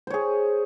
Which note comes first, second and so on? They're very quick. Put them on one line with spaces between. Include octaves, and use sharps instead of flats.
C5 C#5 G#4